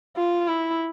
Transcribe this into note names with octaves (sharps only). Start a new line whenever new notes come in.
F4
E4